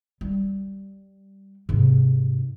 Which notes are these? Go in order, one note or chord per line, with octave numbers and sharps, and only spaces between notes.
G3
G#2 C3